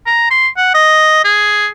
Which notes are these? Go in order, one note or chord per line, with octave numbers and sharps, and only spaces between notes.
A#5
C6
F#5
D#5
G#4